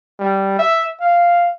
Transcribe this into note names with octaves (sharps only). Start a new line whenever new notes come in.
G3
E5
F5